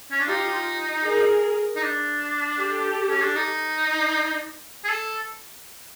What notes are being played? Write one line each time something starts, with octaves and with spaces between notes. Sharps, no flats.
C#4
D4
D#4 F4 G4
G#4 A#4
D#4
D4
G4 A4
C#4
D4
D#4
G#4
A4